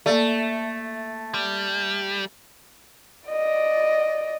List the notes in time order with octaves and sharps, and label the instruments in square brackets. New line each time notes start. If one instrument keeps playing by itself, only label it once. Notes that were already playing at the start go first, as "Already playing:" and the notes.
[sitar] A3 [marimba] A#3 D5
[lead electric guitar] G3
[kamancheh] D5 D#5